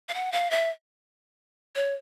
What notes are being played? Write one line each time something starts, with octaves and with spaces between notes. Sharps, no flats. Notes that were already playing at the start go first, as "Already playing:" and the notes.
F5
F#5
F5
E5
C#5